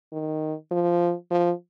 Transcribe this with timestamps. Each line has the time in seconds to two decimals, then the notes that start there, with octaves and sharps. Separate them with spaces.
0.12 D#3
0.71 F3
1.31 F3